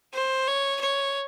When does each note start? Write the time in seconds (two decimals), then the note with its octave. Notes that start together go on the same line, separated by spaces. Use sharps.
0.14 C5
0.48 C#5
0.81 C#5